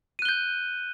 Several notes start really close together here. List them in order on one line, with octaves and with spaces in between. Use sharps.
D#7 F#6 G7 G6